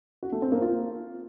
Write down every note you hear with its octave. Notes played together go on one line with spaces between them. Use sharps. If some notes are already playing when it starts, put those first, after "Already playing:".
F#4
A3
C4
A#3
F4